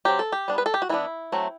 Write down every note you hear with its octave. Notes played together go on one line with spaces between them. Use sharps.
F#3 C4 G4
A4
G4
G3 B3 D4
B4
A4
G4
F#4
E3 B3 D4 E4
F#3 A3 C4